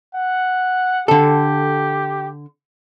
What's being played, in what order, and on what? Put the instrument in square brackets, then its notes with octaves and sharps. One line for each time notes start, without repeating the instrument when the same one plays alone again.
[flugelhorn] F#5
[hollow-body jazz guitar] D3 A4 [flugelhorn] G4